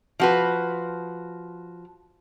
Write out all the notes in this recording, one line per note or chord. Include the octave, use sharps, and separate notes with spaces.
F3 F#4 B4